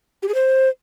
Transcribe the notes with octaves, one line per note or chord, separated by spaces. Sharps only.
G4
G#4
C5